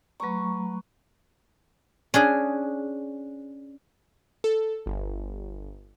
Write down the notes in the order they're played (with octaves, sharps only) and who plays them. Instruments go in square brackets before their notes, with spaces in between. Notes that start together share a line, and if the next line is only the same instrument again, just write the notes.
[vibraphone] F#3 A3 A#5 [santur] B4 C#6
[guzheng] C#4 D4 G#4
[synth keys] A4
G1